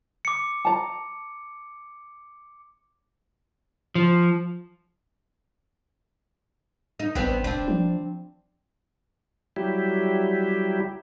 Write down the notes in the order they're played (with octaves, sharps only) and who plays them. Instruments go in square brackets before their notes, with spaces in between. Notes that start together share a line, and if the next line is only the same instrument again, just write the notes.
[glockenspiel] D6 C#7
[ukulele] A5 A#5
[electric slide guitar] F3
[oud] D#4
[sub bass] A1 [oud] B3 C4 D4
[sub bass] E1 [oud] C4 D4
[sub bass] F3
[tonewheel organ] F#3 G3 E4 G4